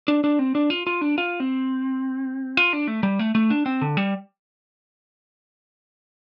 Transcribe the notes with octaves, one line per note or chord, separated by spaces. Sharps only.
D4
D4
C4
D4
F4
F4
D4
F4
C4
F4
D4
A3
G3
A3
A3
D4
C4
D3
G3